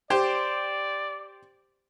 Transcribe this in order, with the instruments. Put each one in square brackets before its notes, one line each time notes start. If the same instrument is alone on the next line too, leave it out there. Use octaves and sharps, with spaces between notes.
[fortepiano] G4 C5 [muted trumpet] D5